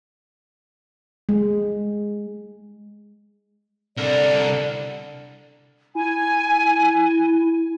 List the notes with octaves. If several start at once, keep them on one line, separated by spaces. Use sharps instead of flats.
G#3
C2 D3 A#4 D5
E4 G#5